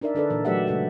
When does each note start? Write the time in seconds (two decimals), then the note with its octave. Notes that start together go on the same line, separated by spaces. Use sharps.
0.01 D4 D#4 A#4 D5 E5
0.15 D3 D4 A4 B4 D5
0.30 A#2 E3 D5
0.45 F#3 A3 G4 E5 F#5
0.67 C#3 G#3 E5 F#5